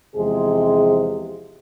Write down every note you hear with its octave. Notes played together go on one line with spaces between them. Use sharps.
E2 C3 F3 G#3 G#4